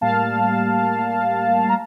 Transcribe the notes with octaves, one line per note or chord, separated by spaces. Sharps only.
A2 G3 A#3 F5 A5
A#5